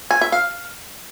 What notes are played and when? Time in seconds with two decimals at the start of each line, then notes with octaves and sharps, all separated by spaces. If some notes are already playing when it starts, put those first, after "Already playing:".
0.11 G#5
0.21 E5
0.32 F5